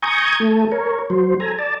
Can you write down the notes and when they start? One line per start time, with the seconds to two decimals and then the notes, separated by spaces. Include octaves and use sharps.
0.02 G#5 A#5 C#6 D#6 G6 G#6
0.40 A3 A4
0.72 A#4 C#5
1.10 F#3 C5
1.40 A4 G#5 A#5
1.59 D5 A5